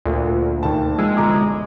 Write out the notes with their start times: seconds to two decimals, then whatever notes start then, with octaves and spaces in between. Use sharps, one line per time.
0.05 D2 A#2 F4
0.63 D#2 A5
0.98 F3 G#3 E6
1.17 G1 A#5 D6